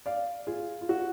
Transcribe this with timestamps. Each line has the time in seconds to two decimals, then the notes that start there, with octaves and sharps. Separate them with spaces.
0.06 D5 F5
0.47 F4 G#4
0.81 F4
0.89 F#4